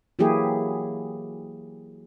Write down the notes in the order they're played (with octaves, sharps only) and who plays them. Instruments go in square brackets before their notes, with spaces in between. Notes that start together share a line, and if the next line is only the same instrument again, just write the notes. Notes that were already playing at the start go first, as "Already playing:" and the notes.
[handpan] E3 F#3 A#3 E4 G4 G#4